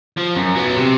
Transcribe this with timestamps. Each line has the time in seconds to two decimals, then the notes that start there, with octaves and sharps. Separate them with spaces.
0.17 F3
0.36 F#2
0.55 F#3 B3
0.77 C3